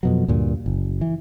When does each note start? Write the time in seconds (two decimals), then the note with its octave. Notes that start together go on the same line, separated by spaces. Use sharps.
0.03 F2 B2 F#3
0.28 D2 G2 A#2
0.66 F#1
1.01 E3